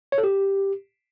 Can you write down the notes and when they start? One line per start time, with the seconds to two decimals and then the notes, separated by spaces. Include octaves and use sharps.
0.12 C#5
0.18 A4
0.24 G4